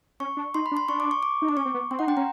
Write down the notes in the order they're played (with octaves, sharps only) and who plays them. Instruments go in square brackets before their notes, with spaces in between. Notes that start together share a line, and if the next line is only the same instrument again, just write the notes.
[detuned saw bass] C#4 [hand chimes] C#6
[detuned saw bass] D4
[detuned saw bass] D#4 [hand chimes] C6
[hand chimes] B5
[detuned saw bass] D4
[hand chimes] C6
[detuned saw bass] D4 [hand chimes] C#6
[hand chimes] D6
C#6
D6
[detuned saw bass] D#4
[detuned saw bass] D4 [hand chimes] D6
[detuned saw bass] C#4 [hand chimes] C#6
[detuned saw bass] C4
B3
[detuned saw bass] C4 [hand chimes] C6
[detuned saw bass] D#4 [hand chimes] F#5
[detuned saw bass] D4 [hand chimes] G5
[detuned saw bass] C#4 [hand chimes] A#5